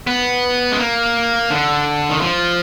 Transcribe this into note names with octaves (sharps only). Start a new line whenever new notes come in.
B3
G#3
A#3
D3
D#3
F3